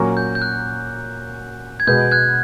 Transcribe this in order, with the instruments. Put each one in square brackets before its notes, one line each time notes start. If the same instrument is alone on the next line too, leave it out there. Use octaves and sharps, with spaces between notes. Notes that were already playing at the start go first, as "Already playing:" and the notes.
Already playing: [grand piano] A#2 F#3 A#3 C#4 F#4
[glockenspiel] G6
G6
F#6
G#6
[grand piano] B2 G#3 B3 [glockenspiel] G6
[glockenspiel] F#6 G#6